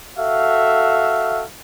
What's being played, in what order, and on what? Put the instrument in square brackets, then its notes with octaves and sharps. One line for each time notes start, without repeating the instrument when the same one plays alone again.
[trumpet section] F#4 A4 E5 F5